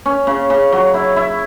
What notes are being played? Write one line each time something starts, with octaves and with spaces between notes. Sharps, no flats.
C#4
C#3
C#3
F#3
E4
E4